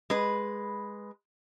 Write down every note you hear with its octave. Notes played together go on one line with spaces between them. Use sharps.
G#3 B4